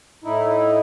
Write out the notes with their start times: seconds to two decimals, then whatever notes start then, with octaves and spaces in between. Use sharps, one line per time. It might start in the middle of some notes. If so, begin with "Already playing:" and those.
0.24 A2 D#4 E4